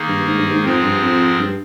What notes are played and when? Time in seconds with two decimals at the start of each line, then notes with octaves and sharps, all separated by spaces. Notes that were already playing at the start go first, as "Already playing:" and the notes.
Already playing: D#3 A#3 D#4 G#4
0.08 G2
0.27 G#2
0.39 G2
0.51 G#2
0.64 F2 G#2 F3 C4 F4 G#4
0.84 G2
1.03 F2
1.39 G2